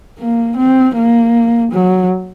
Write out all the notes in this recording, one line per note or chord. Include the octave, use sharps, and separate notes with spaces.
A#3
C4
A#3
F#3